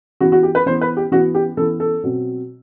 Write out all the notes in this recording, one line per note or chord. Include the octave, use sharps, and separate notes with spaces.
E3 B3 F#4
F#4
G4
B4
E3 B3 C5
B4
G4
E3 B3 F#4
G4
E3 B3 A4
A4
B2 F#3 C4